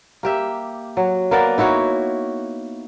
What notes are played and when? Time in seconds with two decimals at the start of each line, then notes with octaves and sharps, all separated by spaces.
0.23 A#3 G4 E5
0.97 F#3
1.31 A#3 B3 A#4 D5
1.58 D#4 E4 F#4 C#5